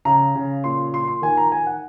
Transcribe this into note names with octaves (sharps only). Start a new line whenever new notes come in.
C#3 A#5
C#3
A#2 C6
A#2 C6
C6
D#3 G#5
A#5
D#3 G#5
F#5